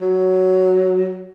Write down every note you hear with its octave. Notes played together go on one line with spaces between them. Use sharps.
F#3